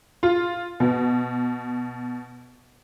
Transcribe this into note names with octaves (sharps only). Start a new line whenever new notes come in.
F4
B2